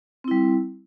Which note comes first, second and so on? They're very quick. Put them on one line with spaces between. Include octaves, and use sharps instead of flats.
C4 E4 G3